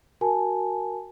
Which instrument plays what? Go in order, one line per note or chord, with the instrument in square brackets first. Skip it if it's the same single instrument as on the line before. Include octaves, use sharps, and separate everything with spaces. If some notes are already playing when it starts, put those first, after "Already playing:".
[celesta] F#4 A#4 G#5 A5